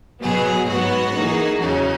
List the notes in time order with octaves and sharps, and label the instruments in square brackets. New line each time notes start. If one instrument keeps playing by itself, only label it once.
[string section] B2 F#3 B3 [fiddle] G#4
[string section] G#2 F#3 B3 [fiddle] F#4
[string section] E3 A#3 D#4 G#4
[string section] E2 C#3 F#3 C#4 [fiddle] D#4